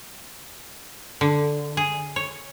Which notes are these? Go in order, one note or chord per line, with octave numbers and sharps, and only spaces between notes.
D3
G#4
C#5